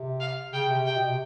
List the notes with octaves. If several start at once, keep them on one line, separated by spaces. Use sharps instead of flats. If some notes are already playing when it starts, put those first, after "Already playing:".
Already playing: C3
F5
C#3 G5
C3
C3 G5
B2
C3